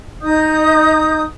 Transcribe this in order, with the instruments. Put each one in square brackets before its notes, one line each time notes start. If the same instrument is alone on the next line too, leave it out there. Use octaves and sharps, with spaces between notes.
[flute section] D#4 D#5 D#6 G6